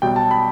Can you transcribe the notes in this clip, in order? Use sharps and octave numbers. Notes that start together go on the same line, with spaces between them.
B1 B2 G3 G5
A5
B5